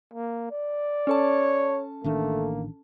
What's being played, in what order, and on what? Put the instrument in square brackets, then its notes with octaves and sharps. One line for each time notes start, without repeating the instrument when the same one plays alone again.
[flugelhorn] A#3
D5
[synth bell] C#4 A4 A5 [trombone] C#5
[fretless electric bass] A1 D#3 D4 [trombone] A3 [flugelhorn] A#3